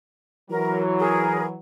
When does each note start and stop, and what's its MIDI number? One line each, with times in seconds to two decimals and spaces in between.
0.51 1.57 52
0.51 1.57 54
0.51 0.81 70
0.99 1.44 68
0.99 1.44 70